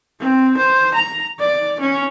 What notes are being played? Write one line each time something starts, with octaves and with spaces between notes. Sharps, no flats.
C4
C5
A#5
D5
C#4